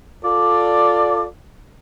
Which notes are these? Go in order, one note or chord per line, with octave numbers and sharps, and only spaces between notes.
F4 A4 D5